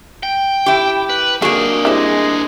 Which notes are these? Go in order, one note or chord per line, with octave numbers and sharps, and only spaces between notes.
G5
E4 G4
B4
F#3 A#3 D4 G#4 D#5
G3 G#3 E4 C5